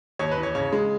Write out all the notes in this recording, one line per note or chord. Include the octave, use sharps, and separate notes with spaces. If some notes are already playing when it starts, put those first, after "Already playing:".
D#2 C#5
B4
E3
C#5
C#3 C#5
G#3